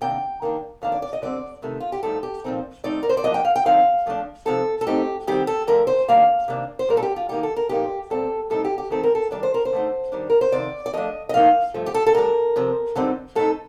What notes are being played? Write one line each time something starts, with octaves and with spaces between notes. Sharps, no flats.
C3 D#3 A#3 D4 G5
D#3 A#3 D4
F2 D#3 A#3 D4 F5
D5
D5
D#5
D3 G3 C4 D5
C3 D#3 A3
F4
G4
G2 F3 A3 D#4 A4
G4
A#2 F3 C4 D#4
D#3 A3 C4 D#4 D5
A#4
C5
D5
G2 D3 F3 A#3 D4 D#5
G5
F5
G5
D3 F3 C4 D#4 F5
A#2 F3 A3 D4
C3 F3 C4 D#4 A4
A4
A2 A3 C4 D#4 G4
D#3 G3 C4 G4
A4
D3 F3 A3 A#4
C5
D#3 G3 A#3 D4 F5
C3 D#3 A#3 D4
C5
A#2 G3 D4 A#4
A4
G4
F4
D#3 A#3 D#4 G4
A4
A#4
A#2 F3 A#3 D#4 G4
A#2 G3 C4 A4
A2 G3 C4 D#4 A4
G4
G4
D#3 A3 C4 D#4 A4
A#4
A4
D#3 G3 D4 D5
C5
A#4
C5
D3 A3 D#4
D#3 G3 D4
A#4
C5
F2 C3 D#3 D5
D5
D3 F3 A3 D4 D#5
D#5
A2 F3 A#3 D#4 F5
G2 F3 A3
G4
A4
A4
A2 G3 D4 A#4
C3 F3 C4
G2 D3 G3 C4 D#4
A2 A3 C4 D#4 A4